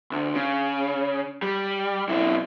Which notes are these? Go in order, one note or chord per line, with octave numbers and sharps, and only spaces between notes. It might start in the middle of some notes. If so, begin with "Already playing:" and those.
D2
C#3
G3
B1 E4